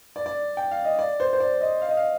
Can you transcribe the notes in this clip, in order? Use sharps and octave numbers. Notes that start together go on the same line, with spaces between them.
D5
D5
G5
F5
D#5
D5
C5
C5
D5
D#5
F5
D#5
F5